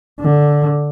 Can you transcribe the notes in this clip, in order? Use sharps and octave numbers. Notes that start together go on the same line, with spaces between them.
D3